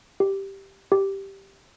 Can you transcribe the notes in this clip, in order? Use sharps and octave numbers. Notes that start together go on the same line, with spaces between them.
G4
G4